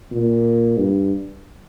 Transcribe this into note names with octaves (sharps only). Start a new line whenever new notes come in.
A#2
G2